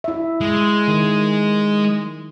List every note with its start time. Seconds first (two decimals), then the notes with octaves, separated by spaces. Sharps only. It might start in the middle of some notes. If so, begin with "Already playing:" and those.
0.04 E4 E5
0.41 G#3
0.88 D#3